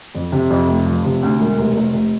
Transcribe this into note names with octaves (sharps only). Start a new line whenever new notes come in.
F2
C3
F2
F1
F3
C3
D2
E1
F1
F1
F1